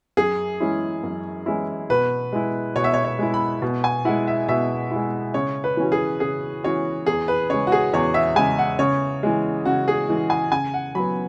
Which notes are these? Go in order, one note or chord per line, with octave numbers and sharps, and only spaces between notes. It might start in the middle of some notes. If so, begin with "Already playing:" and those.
F#2 G#4
E3 G#3 C#4 E4
F#2
E3 G#3 C#4 E4
B2 B4
G#3 E4
B2 C#5
E5
C#5
C#5
G#3 E4
B5
B2
G#5
G#3 E4 F#5
E5
B2 E5
G#3 E4
C#3 C#5
B4
E3 C#4 F#4
G#4
C#3 G#4
E3 C#4 F#4 C#5
E2 G#4
B4
C#3 G#3 C#5
F#4
G#4
E2 C#5
E5
C#3 G#3 G#5
F#5
C#3 C#5
E3 G#3
C#3 F#4
G#4
E3 G#3
G#5
C#3 G#5
F#5
F#3 B3 B5